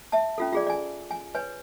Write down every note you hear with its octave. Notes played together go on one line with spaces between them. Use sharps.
E5 A5
C#4 F4 A4
F4 G#4 D5
D5 G#5
G#5
B4 C#5 G#5